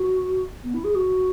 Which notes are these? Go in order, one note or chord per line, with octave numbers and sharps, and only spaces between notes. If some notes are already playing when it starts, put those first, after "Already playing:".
Already playing: F#4
B3
E4
G#4
F#4